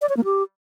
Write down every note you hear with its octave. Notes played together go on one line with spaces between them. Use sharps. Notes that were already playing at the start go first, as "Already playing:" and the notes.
D5
C#5
A#3
G4